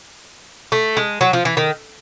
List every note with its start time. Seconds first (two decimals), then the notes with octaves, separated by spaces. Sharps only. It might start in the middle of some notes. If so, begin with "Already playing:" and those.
0.72 A3
0.97 G#3
1.21 F#3
1.33 F3
1.45 E3
1.57 D#3